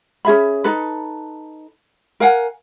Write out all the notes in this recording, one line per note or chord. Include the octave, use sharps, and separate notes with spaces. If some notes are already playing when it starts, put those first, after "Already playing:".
C#4 G#4 E5 B5
D#4 A4 B4
A#4 F5 F#5 G#5